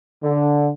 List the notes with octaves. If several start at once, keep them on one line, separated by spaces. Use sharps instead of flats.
D3